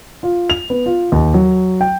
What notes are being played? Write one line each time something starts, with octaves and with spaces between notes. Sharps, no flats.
F4
F7
B3
F4
D#2
F#3
G5